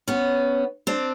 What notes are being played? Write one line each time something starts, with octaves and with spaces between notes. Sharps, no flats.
B3 C#4
C4 D4